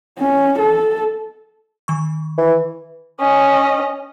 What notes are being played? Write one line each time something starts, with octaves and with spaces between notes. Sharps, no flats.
C#4
A4
D#3 C#6
E3
C#4 D#5